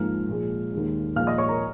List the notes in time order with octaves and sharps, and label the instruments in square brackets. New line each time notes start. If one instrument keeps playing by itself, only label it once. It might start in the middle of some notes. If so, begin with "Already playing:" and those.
Already playing: [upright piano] G#2 F3 A#3 F6
A#2 F3 G#3
D#2 D#3 G#3
A#2 F3 G#3 F5 F6
D#5 D#6
C#5 C#6
A#4 A#5